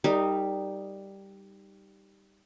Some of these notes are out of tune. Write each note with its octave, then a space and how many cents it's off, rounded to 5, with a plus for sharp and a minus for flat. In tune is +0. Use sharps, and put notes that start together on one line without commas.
G3 +0 D#4 +0 A#4 -35